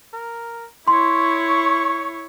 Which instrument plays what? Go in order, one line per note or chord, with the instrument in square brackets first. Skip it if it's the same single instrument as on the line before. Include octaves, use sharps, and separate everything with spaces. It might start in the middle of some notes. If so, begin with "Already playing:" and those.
[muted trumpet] A#4
[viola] E4 C#5 [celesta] C6 [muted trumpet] C#6